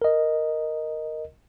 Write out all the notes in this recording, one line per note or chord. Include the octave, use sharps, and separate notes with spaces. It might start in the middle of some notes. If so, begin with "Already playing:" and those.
A#4 D#5